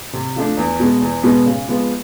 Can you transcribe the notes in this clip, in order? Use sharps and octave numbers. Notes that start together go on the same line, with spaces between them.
C3
F3 A3 D4
E2
B2 G#3 B3
E2
B2 G#3 B3
C#3
F3 G#3 B3